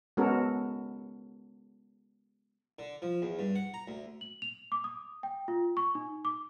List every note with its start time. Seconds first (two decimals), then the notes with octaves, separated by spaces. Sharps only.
0.17 G#3 B3 C#4 F#4 A4 A#4
2.79 D3
3.02 F3
3.22 E2
3.39 G2
3.55 F#5
3.74 A#5
3.88 D2
4.21 F#7
4.42 F7
4.72 D6
4.84 D#6
5.23 G5
5.48 F4
5.77 C#6
5.95 D#4
6.25 D6